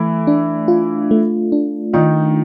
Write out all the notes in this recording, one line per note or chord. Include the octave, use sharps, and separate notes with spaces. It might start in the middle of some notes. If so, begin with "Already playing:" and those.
Already playing: E3 A3 E4
D4
F4
A3
D4
D#3 D#4 F4